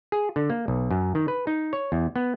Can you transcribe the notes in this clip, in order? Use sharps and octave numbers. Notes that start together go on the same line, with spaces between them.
G#4
D3
A#3
B1
F#2
D#3
B4
D#4
C#5
E2
B3